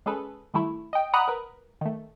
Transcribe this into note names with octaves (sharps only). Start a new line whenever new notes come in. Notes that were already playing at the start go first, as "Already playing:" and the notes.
G#3 C#4 G#4 A4 B4
D#3 G3 A3 E4
D#5 G5
D5 F#5 A#5 B5 D#6 F#6
A#4 B4
D#3 A3